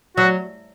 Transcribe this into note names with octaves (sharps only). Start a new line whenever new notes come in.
F#3 F#4